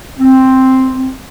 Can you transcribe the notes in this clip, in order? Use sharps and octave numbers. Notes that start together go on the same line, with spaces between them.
C4